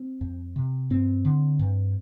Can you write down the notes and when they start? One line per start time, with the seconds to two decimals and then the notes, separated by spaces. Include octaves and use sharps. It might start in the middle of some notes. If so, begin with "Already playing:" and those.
Already playing: C4
0.21 F2
0.56 C3
0.90 G2 C4
1.25 D3
1.59 G2